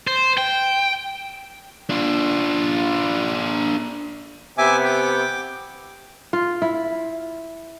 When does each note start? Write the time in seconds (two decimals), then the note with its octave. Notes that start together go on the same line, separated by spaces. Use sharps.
0.07 C5
0.38 G5
1.89 D4 F4
4.58 C3 B3 E5 G#5 D6
4.85 G5 D6
6.33 F4
6.62 E4